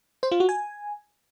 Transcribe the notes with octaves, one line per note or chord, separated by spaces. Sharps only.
C5
F4
F#4
G#5